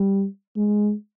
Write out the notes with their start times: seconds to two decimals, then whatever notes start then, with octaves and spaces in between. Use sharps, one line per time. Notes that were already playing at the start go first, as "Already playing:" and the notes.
Already playing: G3
0.57 G#3